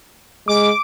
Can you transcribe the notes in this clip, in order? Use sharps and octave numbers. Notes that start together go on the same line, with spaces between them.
G#3 D6